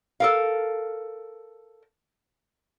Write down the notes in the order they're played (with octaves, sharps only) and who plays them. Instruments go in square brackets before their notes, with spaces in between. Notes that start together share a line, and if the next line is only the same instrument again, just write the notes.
[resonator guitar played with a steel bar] A4 A#4 F5